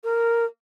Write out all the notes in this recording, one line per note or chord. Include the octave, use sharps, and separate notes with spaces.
A#4